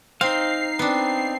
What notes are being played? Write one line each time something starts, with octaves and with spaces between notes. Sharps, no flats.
C4 D#4 F5 C7
B3 C4 D4